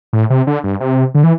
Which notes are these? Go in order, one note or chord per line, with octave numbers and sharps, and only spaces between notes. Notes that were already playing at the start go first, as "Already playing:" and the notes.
A2
C3
D3
G2
C3
D3
E3